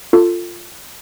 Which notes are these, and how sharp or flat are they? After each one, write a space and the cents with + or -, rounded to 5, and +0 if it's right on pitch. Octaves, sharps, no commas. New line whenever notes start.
F4 +0 A4 +20